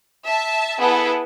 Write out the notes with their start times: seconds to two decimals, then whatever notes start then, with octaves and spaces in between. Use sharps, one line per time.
0.24 E5 A5
0.80 B3 E4 G#4 A4 B4 F#5